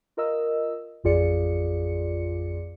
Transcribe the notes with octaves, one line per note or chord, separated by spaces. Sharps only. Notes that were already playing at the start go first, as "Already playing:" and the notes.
F4 A#4 D#5 E6
A1 F2 F4 G#4 D5 C#7